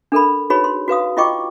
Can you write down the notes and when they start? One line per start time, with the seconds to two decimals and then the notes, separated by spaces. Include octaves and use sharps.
0.12 D4 A4 A#4 B5
0.50 D#4 F#4 G#4 B4 C#5 B5
0.64 C6
0.88 F#4 B4 F5 D#6
1.17 E4 F4 D#5 G5 C#6 D6